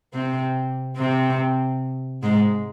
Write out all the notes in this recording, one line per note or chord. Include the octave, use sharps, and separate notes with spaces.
C3 C4
C3 C4
G#2 G#3